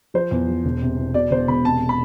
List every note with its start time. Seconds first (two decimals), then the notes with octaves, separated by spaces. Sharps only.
0.14 F3 C5
0.31 E2
0.48 F3
0.65 E1
0.82 C3
0.98 E2
1.14 B2 D5
1.31 E1 C5
1.48 E1 B5
1.65 C3 A5
1.89 B5